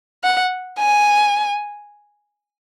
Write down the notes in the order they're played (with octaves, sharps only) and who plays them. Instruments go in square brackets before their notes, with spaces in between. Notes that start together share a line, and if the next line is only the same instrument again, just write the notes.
[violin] F#5
G#5